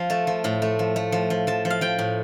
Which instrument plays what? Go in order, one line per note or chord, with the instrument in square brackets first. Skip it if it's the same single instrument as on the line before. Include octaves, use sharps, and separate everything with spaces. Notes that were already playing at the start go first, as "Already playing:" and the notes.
Already playing: [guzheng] F3 F5
A3 A5
F3
A2
A3
F3
A3
F3
F3
F3 A5
F3
F5
F3 G5
A2